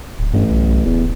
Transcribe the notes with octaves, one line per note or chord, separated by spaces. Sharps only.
D1
A1 G2
B1
D1 E2